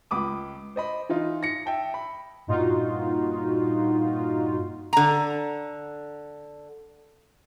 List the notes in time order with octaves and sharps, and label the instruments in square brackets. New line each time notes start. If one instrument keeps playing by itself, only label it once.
[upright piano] C#2 B5 D6 D#6
C5 D#5 B5
E3 D#4 F4
A#6 C#7
E5 G5 A5
B5
[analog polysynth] G2 A#2 D#4 F4 F#4
[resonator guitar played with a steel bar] D3 A#5